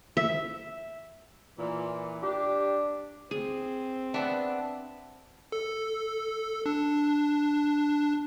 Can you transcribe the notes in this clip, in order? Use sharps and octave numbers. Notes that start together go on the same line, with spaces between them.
E5
A#2 E3
D4 G4
C4 G#4
B3 D4 E5
A4
D4